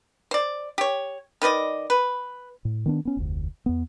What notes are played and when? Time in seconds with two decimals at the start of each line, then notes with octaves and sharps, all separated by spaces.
0.31 C5 D5
0.78 G4 C#5
1.42 D#3 B4 D5 D#5
1.90 B4
2.65 A2
2.86 D#3 B3 D4
3.05 B3 C#4
3.17 F1 D2
3.66 E2 B3